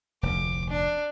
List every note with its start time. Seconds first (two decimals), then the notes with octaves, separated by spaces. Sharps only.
0.23 F1 D2 D6
0.69 D4